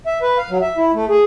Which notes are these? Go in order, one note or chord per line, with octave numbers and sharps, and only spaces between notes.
E5
B4
F5
F#3
E5
E4
A3
G#4